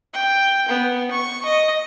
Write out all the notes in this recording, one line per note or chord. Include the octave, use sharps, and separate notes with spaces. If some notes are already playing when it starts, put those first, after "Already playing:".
G5
B3
C#6
D#5